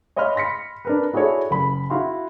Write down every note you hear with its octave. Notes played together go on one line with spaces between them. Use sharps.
C#5 D#5 F5 B5 C6 F6
B5 C6 A#6 B6 C#7
D4 A#4 B4
E4 F#4 G#4 A4 C#5 D5
F#1 B5
E4 F#4 F5 C6